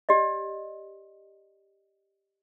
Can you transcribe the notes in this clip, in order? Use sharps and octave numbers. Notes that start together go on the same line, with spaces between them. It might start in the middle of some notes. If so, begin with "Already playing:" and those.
G4 D5 D#5